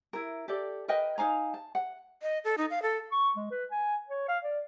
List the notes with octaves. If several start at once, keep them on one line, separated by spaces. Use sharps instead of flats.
E4 A#4
G4 A4 D5
A#4 B4 D#5 G5
D#4 F5 G#5 A#5
A5
F#5
D#5
A4
D#4
F5
A4
C#6
G#3
B4
G#5
C#5
F5
D5